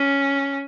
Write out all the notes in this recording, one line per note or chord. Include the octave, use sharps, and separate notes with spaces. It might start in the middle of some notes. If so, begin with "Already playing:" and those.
Already playing: C#4